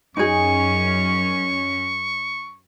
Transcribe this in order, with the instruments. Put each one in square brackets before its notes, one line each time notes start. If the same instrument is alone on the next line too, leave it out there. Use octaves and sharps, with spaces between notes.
[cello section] F#2 C#4 [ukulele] D#4 G#4 [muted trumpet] C#6